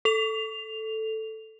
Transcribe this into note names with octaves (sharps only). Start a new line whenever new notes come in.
A4 F7